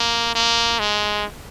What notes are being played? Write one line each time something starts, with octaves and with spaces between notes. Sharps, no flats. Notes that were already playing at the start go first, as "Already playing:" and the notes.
Already playing: A#3
A#3
G#3